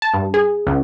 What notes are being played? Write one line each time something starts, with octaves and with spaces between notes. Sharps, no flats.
A5
G2
G#4
C#2